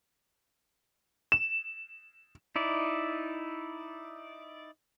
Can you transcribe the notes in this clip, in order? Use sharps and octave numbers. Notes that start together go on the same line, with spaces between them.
E7
D#4 E4 D5